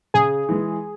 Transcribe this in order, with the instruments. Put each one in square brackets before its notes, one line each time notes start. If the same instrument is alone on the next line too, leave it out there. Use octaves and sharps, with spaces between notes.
[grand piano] C#3 [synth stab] G#4
[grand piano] E3 G#3